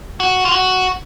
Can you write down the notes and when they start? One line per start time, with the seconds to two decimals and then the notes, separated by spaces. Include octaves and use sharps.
0.20 F#4
0.45 F4
0.52 F#4